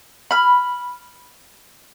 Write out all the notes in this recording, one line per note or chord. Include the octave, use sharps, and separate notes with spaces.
B5 F6